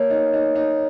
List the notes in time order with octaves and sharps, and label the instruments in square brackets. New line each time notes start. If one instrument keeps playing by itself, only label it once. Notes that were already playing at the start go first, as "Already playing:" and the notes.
Already playing: [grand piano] A#3 [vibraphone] C#5
[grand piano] D#4
D#4
D#4